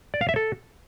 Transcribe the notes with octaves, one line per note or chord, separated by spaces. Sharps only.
D5
F5
E5
A4